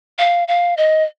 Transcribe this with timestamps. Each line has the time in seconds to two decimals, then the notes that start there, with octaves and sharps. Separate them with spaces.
0.19 F5
0.48 F5
0.77 D#5